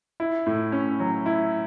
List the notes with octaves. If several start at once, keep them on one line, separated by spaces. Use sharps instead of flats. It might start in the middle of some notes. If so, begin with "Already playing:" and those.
E4
A2
C#4
F#3
E4